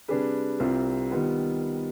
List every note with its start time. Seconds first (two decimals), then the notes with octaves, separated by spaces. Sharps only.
0.08 C3 G3 D4 G#4 B4
0.60 C2 C3 G3 C4 F4
1.11 D#3 G3 B3 F4